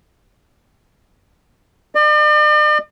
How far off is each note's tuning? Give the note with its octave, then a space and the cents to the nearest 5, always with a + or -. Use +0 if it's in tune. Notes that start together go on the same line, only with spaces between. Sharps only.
D5 +45